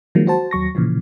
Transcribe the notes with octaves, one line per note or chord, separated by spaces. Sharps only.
D#3 F3 F#3 G#3 A#3
F#4 C5 A5
D#2 F#3 C#6 A#6
A#2 C#3 E3 F3